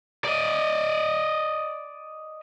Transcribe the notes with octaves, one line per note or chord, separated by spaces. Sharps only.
D5 D#5